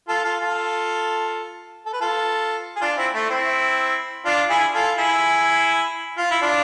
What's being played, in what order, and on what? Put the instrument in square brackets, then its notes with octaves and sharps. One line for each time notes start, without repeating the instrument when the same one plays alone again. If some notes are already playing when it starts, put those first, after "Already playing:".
[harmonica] F4 A4
F4 A4
F4 A4
A4
B4
F4 A4
G#4
D4 F4
C4 E4
A3
C4 E4
D4 F4
E4 G#4
F4 A4
E4 G#4
F4
E4
D4 F4